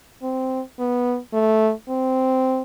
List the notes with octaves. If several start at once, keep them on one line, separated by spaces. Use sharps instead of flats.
C4
B3
A3
C4